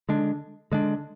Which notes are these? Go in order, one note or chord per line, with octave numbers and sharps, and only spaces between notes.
D3 G#3 D4
D3 G#3 D4